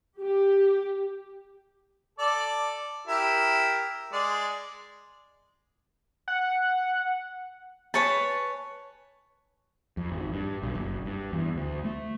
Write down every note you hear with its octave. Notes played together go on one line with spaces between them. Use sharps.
G4
A4 D5
E4 G4 A#4
G#3 D5
F#5
B4 C#5 G#5 A5
F2
G#1
G2
B1
F#1
G2
E2
D2
A3